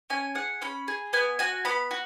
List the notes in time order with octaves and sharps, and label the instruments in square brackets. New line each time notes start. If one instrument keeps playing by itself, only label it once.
[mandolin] C#4 G#5
G#4 F#5
C#4 B5
G#4
B3 G#5
F#4 G#5
B3 B5
F#4